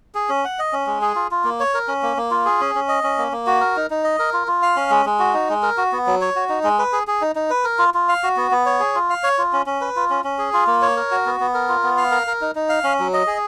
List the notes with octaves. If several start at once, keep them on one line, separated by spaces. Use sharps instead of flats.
G#4
C#4
F#5
D#5
C#4
G#3
G#4
F4
F4
A#3
C#5
A#4
C#4
A#3
A#3
F4
G#4
C#4
C#4
D#5
C#4
A#3
A#3
F#4
A#4
D#4
D#4
D#5
A#4
F4
F4
F5
C#4
G#3
G#3
F#4
D#4
G#3
A#4
F#4
B3
F#3
C#5
F#4
D#4
G#3
B4
G#4
G#4
D#4
D#4
B4
A#4
F4
F4
F5
F#4
B3
B3
C#5
G#4
F4
F5
C#5
F4
C#4
C#4
B4
F4
C#4
C#4
G#4
F4
A#3
C#5
A#4
F#4
B3
B3
A#4
F4
B3
F5
A#4
A#4
D#4
D#4
F5
C#4
F#3
D#5
G#4